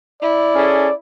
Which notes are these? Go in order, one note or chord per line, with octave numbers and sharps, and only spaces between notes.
E4 D5
C#4 G#4 A4